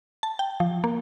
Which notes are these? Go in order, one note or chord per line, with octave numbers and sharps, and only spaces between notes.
A5
G5
F3
A#3